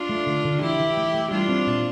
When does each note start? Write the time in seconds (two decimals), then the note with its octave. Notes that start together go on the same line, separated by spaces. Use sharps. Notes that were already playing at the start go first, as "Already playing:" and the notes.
Already playing: D4 F4
0.09 A3
0.26 D3
0.45 D3
0.62 E3 E4 G4
0.80 E3
0.97 A3
1.14 A3
1.31 G3 D4 F4
1.49 C4
1.67 A#2